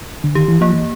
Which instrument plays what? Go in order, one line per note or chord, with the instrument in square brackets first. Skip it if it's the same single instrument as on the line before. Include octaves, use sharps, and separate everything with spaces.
[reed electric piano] D3
[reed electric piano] D#3 [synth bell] G4
[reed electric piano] E3
[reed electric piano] F3 [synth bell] A#3
[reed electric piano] E3